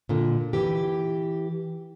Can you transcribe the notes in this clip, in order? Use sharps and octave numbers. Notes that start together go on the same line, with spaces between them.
A#2 D3
E3 G4